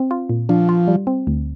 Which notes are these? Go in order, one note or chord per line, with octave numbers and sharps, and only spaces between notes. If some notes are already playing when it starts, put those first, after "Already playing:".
Already playing: C4
F4
A#2
F3 D4
F4
G3
C4
D2